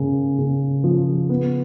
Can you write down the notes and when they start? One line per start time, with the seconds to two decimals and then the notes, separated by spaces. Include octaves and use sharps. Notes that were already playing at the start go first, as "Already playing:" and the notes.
Already playing: C#3 A#3
0.39 C#3
0.84 F3
1.29 B3